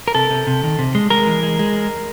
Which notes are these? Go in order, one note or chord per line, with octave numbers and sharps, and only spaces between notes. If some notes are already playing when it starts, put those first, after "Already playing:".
A#4
C3 A4
C3
C3
D#3
C3
G#3
G#3 A#4
E3
G#3
G#3